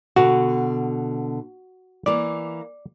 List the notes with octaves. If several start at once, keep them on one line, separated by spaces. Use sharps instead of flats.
B2 D3 F#4
E3 A#3 D5